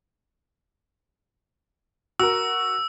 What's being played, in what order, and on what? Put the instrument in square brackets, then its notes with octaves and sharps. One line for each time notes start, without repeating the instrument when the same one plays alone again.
[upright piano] F#4 A#4 [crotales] E6